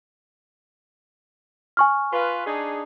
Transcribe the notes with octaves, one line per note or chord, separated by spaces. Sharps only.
G#5 C#6 F6
F4 B4
D4 D#4 G#4